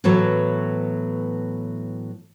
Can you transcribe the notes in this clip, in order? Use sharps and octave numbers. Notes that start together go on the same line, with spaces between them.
A2 E3 F#3 B3 A4 C#5